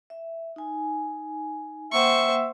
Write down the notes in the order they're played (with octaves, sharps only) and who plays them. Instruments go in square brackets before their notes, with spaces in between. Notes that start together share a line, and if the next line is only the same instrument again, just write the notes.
[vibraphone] E5
D#4 G#5
[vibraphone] A#3 F#5 G5 [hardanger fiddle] C5 C#6 [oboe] E5